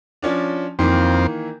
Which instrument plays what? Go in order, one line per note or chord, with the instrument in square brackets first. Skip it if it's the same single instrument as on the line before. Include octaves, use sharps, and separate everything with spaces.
[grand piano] F3 C#4 D4
[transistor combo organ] F2 C4 [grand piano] D#3 E3 A#3